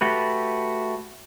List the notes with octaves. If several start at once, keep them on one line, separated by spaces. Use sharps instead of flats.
A3 F#4 G4 B4